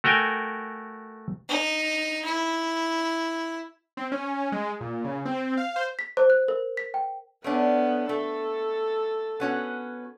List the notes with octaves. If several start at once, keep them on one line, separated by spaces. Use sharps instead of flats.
A3 F#4 A#4 G5 G#5
D#4
E4
C4
C#4
G#3
A#2
C#3
C4
F5
C5
B6
C5
F#6
A#4
B6
G5
A3 B3 C#4 D4
A3 A4
B3 C#4 F#4